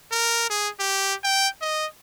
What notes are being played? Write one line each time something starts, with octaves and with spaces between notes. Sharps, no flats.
A#4
G#4
G4
G5
D#5